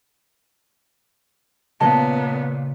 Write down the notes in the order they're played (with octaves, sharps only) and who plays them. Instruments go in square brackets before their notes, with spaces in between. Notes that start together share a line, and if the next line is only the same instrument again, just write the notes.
[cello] A#2 [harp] C#3 [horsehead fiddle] B3 [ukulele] D#5 A5